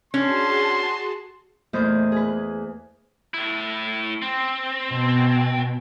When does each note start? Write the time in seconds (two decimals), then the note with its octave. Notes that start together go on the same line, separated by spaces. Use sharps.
0.14 C#4 D4 F#4 G#4 A5 C6
1.73 E2 A#2 A3 C5 D#5 G6
2.12 G#4 B4
3.34 A2 E4
4.22 C4
4.93 B2